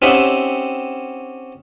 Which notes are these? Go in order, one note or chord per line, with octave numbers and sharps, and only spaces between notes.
C4 C#4 D#4 G4 E5 F#5